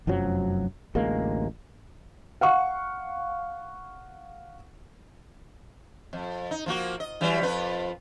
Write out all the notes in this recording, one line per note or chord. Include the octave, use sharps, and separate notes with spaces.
F1 F#2 F3 F#3
A1 D2 G#3 A#3
F5 F#5 C#6
F2
D#4
F3 A#3 F#4
D#5
E3 F#3 G3
F2 F4 B4